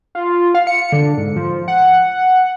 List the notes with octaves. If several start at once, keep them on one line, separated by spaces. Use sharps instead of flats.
F4
F5
C#7
D3
G#2
F3
F#5